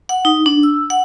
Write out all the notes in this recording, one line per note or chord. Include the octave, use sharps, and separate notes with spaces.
F#5
D#4
D4
E6
F#5